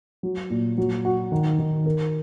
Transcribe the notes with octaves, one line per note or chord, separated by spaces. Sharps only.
F#3
A#2
F#3
F#4
D#3
D#3
A#4